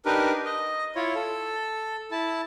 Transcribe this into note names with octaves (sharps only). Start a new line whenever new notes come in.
D4 D#4 G4 A#4 B4
D#5
E4 F4 C#5
A4
E4 A5